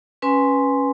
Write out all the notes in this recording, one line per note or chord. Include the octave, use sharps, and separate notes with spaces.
C#4 B4 G#5 C6